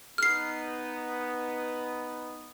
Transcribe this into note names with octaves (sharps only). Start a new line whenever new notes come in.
B3 D#4 F6 C7